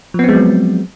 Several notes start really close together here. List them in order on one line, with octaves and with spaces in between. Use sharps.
F3 B3 C4 G#3 F#3